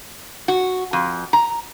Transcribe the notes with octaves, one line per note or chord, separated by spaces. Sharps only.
F#4
F2
A#5